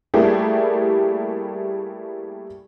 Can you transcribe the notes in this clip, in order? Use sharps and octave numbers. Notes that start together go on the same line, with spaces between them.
G3 A3 A#3 E4 G4 G#4